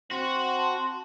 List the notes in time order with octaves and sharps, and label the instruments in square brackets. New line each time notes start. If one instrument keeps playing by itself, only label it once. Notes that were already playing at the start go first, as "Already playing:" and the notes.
[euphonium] C4 [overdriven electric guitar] F#4 [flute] C6
[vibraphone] A5